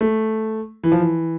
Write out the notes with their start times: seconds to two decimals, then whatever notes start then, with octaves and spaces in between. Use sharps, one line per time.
0.01 A3
0.84 E3
0.92 F3
1.00 E3